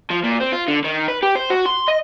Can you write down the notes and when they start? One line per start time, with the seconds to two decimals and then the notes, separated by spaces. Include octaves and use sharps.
0.10 F3
0.23 A#2
0.40 C4
0.52 F4
0.68 D3
0.85 D#3
1.08 B4
1.23 G4
1.35 C5
1.50 F#4
1.66 C6
1.88 D#5